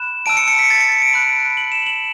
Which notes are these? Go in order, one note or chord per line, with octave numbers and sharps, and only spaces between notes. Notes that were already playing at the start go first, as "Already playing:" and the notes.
Already playing: B5 F#6 E7
A5 E6 D7
C#7
C#7
B6
A6
C#7
C#7
D7
B5 F#6 D7
F#7
E7
F#7